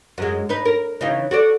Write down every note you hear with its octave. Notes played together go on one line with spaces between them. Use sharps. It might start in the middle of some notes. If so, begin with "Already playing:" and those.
F#2 G#3
D#4 B4
A#4
C#3 E3 D#4
F#4 A4 D5